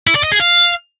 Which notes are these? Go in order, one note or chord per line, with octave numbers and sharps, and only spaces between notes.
E4
D5
D#5
G#4
F5